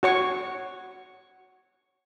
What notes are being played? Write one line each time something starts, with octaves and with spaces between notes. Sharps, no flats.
F#4 C#5 C#6